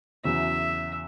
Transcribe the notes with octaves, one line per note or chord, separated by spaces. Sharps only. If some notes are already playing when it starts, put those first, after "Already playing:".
E2 C#3 F#3 E5